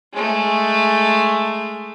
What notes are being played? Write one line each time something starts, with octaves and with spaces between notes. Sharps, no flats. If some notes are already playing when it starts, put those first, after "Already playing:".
G#3 A3